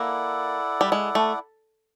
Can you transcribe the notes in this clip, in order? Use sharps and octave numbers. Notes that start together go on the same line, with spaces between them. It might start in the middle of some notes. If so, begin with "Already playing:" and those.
Already playing: A#3 E4 A4 D5 F#5
G3
G#3
A3